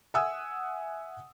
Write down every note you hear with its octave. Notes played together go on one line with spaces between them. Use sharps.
E5 F#5 G#5 D#6 E6